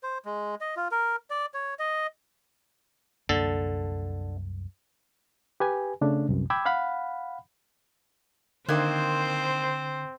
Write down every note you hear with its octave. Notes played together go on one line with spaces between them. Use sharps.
C5
G#3
D#5
F4
A#4
D5
C#5
D#5
C2 F#2 D3 A#3 A4
G4 B4 G#5
C#3 A3 D4
C2 F#2
G5 B5 D6 E6 G#6
F5 F#5 B5
D3 D#3 A#3 C4 C5 F#6 G#6